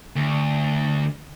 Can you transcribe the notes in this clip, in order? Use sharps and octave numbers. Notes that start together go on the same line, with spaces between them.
D2